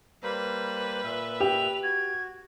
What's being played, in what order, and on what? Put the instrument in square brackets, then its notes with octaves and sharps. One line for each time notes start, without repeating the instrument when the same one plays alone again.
[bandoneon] G3 A#3 C5 [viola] B4
[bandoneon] A#2 E5
[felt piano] G4 [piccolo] F7
[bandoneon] F#4 [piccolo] G#6